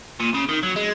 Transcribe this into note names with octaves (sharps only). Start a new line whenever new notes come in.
A#2
C#3
D#3
F#3
G#3